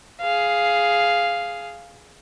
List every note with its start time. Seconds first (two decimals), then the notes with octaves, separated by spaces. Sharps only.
0.22 G#4 F5